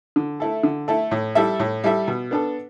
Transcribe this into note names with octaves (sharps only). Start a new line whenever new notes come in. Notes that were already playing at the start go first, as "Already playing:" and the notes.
D3
A3 E4 A4
D3
A3 E4 A4
A2
G3 E4 A4 E5
A2
G3 E4 A4 E5
B2
B3 D4 A4